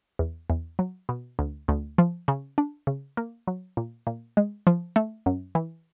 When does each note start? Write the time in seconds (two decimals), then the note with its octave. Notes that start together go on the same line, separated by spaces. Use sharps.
0.19 E2
0.50 E2
0.79 F#3
1.09 B2
1.39 D2
1.68 D2
1.98 F3
2.28 C#3
2.58 D4
2.87 C#3
3.17 A#3
3.47 F#3
3.77 A#2
4.07 A#2
4.37 G#3
4.67 F3
4.96 A3
5.26 F#2
5.55 E3